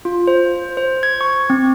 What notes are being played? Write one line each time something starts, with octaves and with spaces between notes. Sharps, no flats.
F4
C5
C5
G#6
C#6
C4